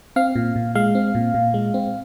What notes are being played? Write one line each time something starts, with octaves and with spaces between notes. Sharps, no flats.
C4 F5
A#2
A#2
G#3 F5
C4
A#2
A#2
G#3
C4